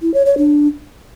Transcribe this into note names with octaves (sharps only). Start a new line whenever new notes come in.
E4
C#5
C#5
D4